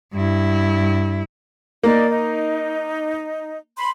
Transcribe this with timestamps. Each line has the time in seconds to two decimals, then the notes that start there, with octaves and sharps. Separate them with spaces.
0.13 G2 E4
1.83 A#3 D#4 D5
2.10 D#4
3.77 B5 C6